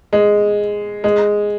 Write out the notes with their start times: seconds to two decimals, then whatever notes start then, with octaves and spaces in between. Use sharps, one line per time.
0.13 G#3
1.04 G#3